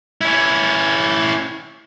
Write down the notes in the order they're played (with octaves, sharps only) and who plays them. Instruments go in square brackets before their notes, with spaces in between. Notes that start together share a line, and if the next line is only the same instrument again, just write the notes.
[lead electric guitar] C#4 E4